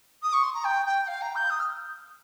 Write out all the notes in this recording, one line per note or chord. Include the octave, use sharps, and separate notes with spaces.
D#6
C#6
C6
A#5
G5
G5
F5
A#5
G6
D#6
F6